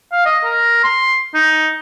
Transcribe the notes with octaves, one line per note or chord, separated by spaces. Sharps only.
F5
D#5
A#4
C6
D#4